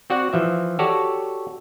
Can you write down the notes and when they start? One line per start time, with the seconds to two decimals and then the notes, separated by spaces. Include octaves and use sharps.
0.10 C4 F#4 D5 F#5
0.33 E3 F3 E5
0.79 F#4 G4 A4 C#5 D5